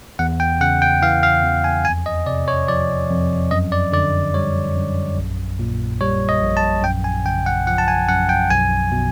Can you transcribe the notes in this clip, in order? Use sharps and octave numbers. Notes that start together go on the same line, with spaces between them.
E2 F#5
G5
C#3 F#5
G5
E3 F5
F5
E2
G#5
F2 G#5
D#5
C3 D5
C#5
F3 D5
F2
F#2 D#5
D5
D3 D5
G3 C#5
F#2
A#1
A#2
G3 C#5
D#5
A#1
A5
F#2 G5
G#5
C#3 G5
F#5
F3 F#5
A5
G#5
F#2 F#5
G5
B1 G#5
B2